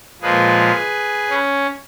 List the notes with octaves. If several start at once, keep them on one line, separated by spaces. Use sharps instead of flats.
A#2 F3 G#3 G#4 B4
C#4